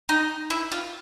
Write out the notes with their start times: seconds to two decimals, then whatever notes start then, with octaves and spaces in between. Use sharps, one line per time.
0.09 D#4
0.50 E4
0.72 F4